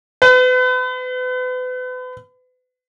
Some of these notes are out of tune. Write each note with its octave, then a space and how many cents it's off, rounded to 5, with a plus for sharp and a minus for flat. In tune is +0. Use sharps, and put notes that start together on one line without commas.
B4 +40